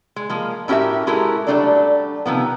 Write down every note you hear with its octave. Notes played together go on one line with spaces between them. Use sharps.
G#3
F3 G#3 A#3
A2 C#4 F#4 G4 A#4 E5
G#3 E4 F#4 G4 A4 A#4
F#3 G3 A3 D4 A4 D5
C3 D#3 F3 B3